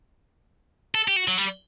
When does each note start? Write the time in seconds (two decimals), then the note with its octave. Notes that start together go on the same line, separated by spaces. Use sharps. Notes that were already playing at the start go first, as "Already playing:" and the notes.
0.95 A4
1.08 G4
1.16 F#4
1.28 F#3
1.38 G3